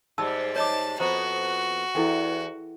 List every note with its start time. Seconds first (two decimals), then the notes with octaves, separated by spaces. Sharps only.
0.18 G#2 G3 A5 E6
0.56 C#5 D#5 A5 D6
1.00 F2 B3 F#4 C5 A#5 D#6
1.95 E2 E4 A4 G5